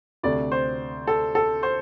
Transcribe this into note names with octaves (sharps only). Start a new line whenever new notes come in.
D2 C3 A3 D5
C5
A4
A4
C5